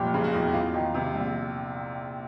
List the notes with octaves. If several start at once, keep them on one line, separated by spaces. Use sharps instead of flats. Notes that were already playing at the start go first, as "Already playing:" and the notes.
Already playing: F1 A#2 G4
C#3
F#4
E2
E2 F4
D#3
C3
A#1